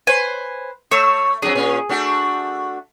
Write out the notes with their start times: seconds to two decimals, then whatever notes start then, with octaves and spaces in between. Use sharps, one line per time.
0.07 B4 C5 G#5
0.91 A3 C#5 E6
1.42 F2 F#3 D4 G#4
1.55 A#2 C#4
1.89 A3 D4 F#4